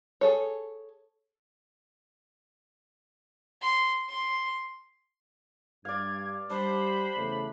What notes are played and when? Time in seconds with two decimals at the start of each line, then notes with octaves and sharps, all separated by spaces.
0.21 G#4 A4 C#5
3.61 C6
4.09 C6
5.85 G2 D5 F5 G#6
6.50 G3 D4 C5 B5
7.17 E2 C#3 A3